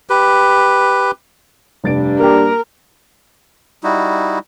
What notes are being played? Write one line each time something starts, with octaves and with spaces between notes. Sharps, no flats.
G4 B4
F1 G2 G3 D4 A6 D7
A#3 G4 A#4
G3 D#4 E4 F#4